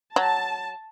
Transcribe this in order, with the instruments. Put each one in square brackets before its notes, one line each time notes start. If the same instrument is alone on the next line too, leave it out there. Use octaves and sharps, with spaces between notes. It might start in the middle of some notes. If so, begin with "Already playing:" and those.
[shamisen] F#3 [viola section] A5